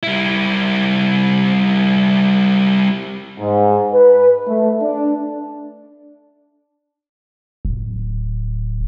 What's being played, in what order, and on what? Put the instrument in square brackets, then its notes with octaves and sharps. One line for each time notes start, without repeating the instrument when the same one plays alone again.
[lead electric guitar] G3 E4
[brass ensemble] G#2
B4
A3
D4
[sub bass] D1